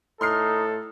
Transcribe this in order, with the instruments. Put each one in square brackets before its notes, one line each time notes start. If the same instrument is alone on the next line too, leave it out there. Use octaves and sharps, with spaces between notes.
[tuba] A2 [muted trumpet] D#4 [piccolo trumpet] A4 [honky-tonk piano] C6 F6 C7